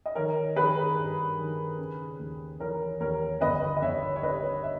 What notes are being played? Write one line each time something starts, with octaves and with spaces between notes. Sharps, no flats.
D#5
D#3 A#4 C#5
D#3 G#4 B4
G2
D#3
C#3
D#2
E3 A#4 C#5
D#2 A#4 C#5
G1 B4 D#5
D#5
G1 C#5 E5
C#5
G2 B4 D#5
C#5 E5